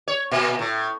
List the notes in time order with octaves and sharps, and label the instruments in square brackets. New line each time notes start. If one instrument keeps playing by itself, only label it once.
[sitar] C#5
A#2
A2